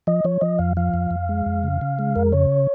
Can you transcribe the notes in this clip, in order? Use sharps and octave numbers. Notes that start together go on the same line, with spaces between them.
F3 D#5
F3 C#5
F3 D#5
F2 F5
F3 F5
F2
F2
G#3
F2
C#3
C#3
G#3
F2 A#4
C#3 C#5